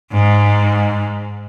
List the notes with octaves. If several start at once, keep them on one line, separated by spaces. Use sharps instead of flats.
G#2